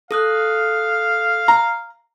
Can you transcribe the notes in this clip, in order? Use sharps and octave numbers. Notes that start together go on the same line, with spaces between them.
A4 F5 D#6 F#6
A#5